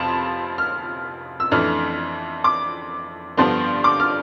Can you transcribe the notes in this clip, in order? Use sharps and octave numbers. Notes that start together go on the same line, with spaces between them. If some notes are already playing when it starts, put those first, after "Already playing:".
Already playing: F2 C3 F3 A5 B5
F6
E6
F2 E3 A3 D4 F6
D6
G2 D3 F3 B3 D4 C6
D6
F6